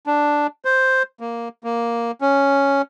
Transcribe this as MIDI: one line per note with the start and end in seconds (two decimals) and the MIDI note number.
0.07 0.47 62
0.65 1.03 72
1.20 1.49 58
1.64 2.11 58
2.21 2.82 61